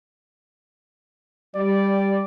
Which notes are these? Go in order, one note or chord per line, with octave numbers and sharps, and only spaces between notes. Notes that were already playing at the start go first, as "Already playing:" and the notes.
G3 D5